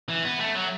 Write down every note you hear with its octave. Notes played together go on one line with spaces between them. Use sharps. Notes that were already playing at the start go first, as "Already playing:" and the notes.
E3
B3
A3
F#3